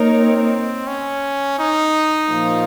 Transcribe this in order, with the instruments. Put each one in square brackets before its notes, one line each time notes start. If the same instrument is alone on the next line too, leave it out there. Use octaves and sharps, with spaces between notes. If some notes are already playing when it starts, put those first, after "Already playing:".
Already playing: [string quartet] A#3 D#4 A#4 C#5
[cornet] C4
C#4
D#4
[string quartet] A#2 F3 A#3 F4